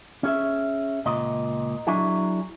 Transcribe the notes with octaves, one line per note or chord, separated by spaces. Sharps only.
C#4 G#4 E5
C#2 A#2 D#5
F#3 D4 E4 G#4